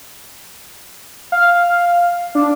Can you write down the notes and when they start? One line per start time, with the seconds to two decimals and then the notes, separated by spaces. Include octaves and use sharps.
1.32 F5
2.35 D4